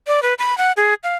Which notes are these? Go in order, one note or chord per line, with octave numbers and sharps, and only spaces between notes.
D5
B4
B5
F#5
G#4
F5